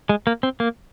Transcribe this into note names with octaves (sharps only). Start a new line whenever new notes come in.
G#3
A#3
C4
A#3